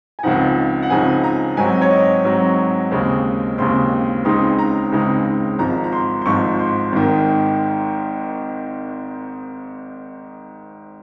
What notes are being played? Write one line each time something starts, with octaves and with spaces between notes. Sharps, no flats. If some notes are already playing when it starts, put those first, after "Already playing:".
G#5
C#2 C#3 F3 C4 D#4 F#5
F#5
C#2 C#3 F3 C4 D#4 G#5
A#5
G#2 F#3 C4 G#5
C#5
D#5
G#2 F#3 C4
D#2 C#3 G#3 C4
D#2 C#3 G#3 C4 C6
C#2 C#3 G#3 C4 D#4 C6
A#5
C#2 C#3 G#3 C4 D#4
G#1 G#2 F3 A#5
A#5
C6
C6
G#1 G#2 F3 C#6
C6
G#1 G#2 D#3